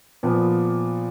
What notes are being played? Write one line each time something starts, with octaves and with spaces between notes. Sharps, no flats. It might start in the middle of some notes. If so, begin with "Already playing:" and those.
A#2 F3 B3